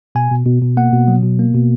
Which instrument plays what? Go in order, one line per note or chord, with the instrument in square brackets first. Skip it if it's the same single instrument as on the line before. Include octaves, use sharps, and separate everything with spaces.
[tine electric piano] B2 G#5
B2
B2
B2
A#3 F#5
B2
F#3
B2
A#3
B2